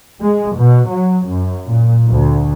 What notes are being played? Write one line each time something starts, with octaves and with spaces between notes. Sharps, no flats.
G#3
B2
F#3
F#2
A#2
D2